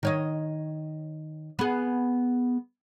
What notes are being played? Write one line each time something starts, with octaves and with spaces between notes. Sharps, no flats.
D#3 C#5 D#5
B3 G#4